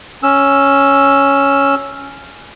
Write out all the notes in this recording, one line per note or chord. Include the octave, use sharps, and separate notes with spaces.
C#4 E6